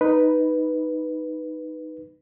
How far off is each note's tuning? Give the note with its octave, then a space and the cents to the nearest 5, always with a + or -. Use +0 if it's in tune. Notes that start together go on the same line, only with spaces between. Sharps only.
D#4 +0 B4 +0